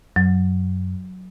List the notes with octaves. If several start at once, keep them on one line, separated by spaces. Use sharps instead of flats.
F#2 F#3